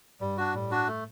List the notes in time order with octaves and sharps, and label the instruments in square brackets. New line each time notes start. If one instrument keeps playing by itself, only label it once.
[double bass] G2 [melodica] G3
[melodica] D4 F#4
[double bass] A2 [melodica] G3
[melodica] D4 F#4
A3